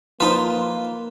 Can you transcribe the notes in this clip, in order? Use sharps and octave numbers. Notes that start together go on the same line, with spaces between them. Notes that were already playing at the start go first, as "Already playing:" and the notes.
F3 A#3 D#4 F4 B4 C5